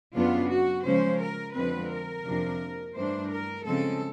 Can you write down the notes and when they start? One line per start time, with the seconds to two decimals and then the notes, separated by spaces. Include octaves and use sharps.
0.15 F#2 C#3 F#3 B3 D4 F4
0.49 F#4
0.85 C#3 F3 G#3 C#4 C5
1.20 A#4
1.55 F2 D3 F3 G#3 C4 B4
1.90 A#4
2.25 F2 C3 F3 A#3 D4
2.95 G2 E3 A3 D4 C5
3.30 A#4
3.65 C#3 F3 G#3 C4 A4